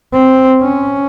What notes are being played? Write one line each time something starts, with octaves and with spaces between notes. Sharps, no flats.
C4
C#4